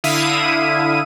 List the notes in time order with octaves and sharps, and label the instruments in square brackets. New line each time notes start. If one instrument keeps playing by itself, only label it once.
[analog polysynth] D3 E4 E5 F5 D#6 D#7